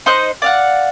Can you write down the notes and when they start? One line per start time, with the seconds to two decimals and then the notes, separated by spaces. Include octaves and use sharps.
0.06 D#4 C5 D#5 F#6
0.42 D5 F5 F#5